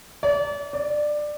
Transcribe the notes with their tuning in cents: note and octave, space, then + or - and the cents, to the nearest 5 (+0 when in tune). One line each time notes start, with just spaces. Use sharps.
D5 -35
D5 +15